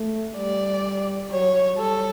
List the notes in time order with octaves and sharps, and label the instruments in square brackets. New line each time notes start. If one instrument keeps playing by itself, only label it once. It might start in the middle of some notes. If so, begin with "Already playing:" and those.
Already playing: [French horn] A3
[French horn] G3 [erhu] D5
[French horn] F#3 [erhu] C#5
[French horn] G3 [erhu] A4